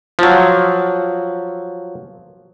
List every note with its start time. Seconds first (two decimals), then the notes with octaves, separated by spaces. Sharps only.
0.19 F3 F#3